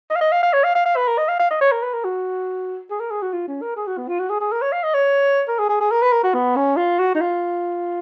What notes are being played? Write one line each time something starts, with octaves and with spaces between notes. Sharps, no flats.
D#5
F5
D#5
F5
F5
C#5
F5
F5
F5
B4
A#4
D#5
F5
F5
D#5
C#5
A#4
B4
A#4
F#4
G#4
A#4
G#4
F#4
F4
C#4
A#4
G#4
F#4
B3
F4
F#4
G#4
G#4
A#4
C#5
F5
D#5
C#5
A#4
G#4
G#4
G#4
A#4
B4
A#4
F#4
B3
C#4
F4
F#4
D#4
F4